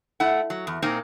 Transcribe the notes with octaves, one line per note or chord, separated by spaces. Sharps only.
A3 E4 F#5
F#3
E2
A#2 A#3 C4 D#4 A#4